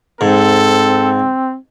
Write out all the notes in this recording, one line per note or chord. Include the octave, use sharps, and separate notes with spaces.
G#2 C4 A4